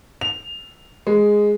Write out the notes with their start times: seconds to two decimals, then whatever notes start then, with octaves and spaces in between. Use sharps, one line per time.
0.21 F7
1.07 G#3